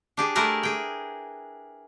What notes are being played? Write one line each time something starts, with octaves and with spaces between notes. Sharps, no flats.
D4 G4 G#4
A3 E4 G4 G#4 A#4 B4
G#4 G5